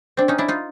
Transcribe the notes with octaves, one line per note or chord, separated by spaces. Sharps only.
C4 D4
C#4 D#4
D4 E4
D#4 F4